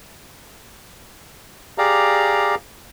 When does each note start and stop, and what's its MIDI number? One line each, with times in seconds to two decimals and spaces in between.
1.78 2.55 67
1.78 2.55 68
1.78 2.55 74
1.78 2.55 77
1.78 2.55 82